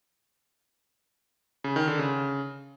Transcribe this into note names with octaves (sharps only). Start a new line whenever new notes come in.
C#3
D#3
D3
C#3